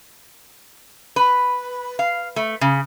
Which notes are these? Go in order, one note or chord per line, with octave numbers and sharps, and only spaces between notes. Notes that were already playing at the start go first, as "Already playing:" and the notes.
B4
F5
A3
C#3